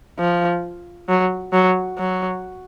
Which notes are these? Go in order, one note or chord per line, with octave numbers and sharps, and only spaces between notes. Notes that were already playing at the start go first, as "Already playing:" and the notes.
F3
F#3
F#3
F#3